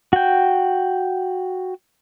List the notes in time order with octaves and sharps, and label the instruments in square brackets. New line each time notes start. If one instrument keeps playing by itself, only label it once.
[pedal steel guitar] F#4 G5